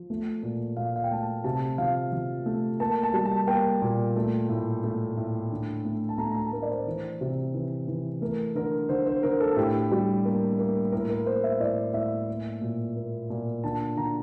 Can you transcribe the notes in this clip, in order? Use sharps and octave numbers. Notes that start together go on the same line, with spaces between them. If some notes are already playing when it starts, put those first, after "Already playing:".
Already playing: F3
A3
A#2
A#2 F5
F5
G5
A3 A5
C3 A5
F3 F5
F3
A3
A#3 A5
A5
G3
A5
A#3 G5
A#2
A3
A2
A3
A2
D3
A3
A5
A3 A#5
A#5
A5
A3 A#4
D5
C5
E3
C3
E3
E3
A3 A#4
D3 A#4
D3 C5
C5
D3 A#4
A4
A2 G4
G3
A#3
A#3
A2 A#4
A#4
A#3 C5
E5
A2 D5
A2 E5
A#3
A#2
A#3
A#2
D3 A5
D3 A#5